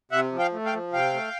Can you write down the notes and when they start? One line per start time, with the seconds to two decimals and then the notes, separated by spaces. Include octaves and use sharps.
0.12 C3 E5 F#5
0.32 F3
0.39 F5 G5
0.53 A3
0.66 F5 G5
0.73 F3
0.93 C3 F5 G5
1.13 A3